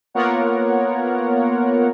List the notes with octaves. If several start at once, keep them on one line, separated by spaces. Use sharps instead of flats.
A#3 B3 F4 A#4 C#5 F#5